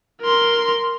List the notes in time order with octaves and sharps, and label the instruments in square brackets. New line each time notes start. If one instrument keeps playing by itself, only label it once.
[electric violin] A#4 C6